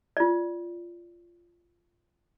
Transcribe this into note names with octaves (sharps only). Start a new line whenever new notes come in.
F4 D5